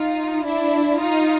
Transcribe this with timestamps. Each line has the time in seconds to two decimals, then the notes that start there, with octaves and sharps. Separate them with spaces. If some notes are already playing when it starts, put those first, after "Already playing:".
Already playing: D#4 F4
0.44 D4 E4
0.99 D#4 F4